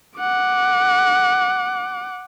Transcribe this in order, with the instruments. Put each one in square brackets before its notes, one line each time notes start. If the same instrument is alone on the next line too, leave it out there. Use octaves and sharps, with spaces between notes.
[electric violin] F#5 D6